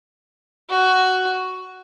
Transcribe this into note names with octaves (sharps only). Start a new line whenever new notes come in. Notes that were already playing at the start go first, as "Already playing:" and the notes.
F#4